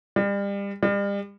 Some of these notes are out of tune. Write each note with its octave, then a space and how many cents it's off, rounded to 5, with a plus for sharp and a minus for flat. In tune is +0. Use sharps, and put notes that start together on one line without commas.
G3 +35
G3 +40